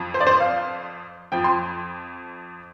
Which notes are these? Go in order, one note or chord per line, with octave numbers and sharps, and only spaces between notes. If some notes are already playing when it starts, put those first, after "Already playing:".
Already playing: F2 F3
C5
D5
C5
F5
F2 F3 G5
C6